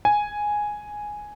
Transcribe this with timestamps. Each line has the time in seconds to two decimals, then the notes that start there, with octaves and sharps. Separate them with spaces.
0.05 G#5